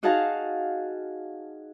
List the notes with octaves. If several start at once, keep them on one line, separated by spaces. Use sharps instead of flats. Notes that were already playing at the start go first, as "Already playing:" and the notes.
D#4 F#4 G#4 F5 A5